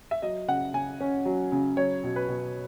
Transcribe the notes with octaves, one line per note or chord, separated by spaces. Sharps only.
E5
F#3 D#5
C#3 F#5
C#3 G#5
C#4
F#3
C#3
F#3 C#5
B2
B4
B2